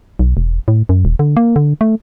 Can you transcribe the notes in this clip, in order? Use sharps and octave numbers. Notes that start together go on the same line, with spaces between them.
B1
E1
A2
F#2
D#1
D3
A#3
D3
A3